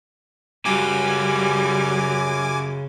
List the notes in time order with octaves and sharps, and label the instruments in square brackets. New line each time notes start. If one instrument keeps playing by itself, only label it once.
[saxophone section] F#2 [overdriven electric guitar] C#3 F4 [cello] G3 [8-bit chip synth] G#5 D6